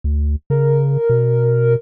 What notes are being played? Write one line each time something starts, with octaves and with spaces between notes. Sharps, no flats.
D2
C#3 A#4
B2